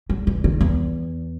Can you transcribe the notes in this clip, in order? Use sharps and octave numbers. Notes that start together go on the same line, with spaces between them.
F#3
E3
D#3
E2